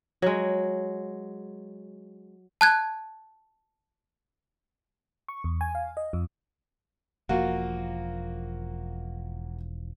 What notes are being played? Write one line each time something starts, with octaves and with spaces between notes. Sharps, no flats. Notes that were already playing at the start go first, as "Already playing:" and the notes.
F#3 G#3
A5 F#6 G#6
C#6
E2
G#5
F5
D#5
F2
E1 F3 A#3 F#4